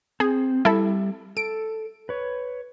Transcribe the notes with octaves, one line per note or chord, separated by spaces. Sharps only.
C4 G#4
G3 E4 A4 E5
A4 D7
B4 C#5